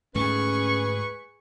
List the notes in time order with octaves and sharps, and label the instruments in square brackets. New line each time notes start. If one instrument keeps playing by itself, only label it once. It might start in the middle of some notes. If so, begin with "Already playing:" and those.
[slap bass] D2 G#2 A3 [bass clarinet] C#4 [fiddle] G#4 C#6 [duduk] B4